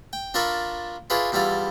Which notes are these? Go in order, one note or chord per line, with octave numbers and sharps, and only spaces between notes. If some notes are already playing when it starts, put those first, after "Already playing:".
G5
D4 F4 A4 A#4 B5 C#6
E4 F4 G#4 B4 C#5 D5
E2 G3 E4 F4 A4 F5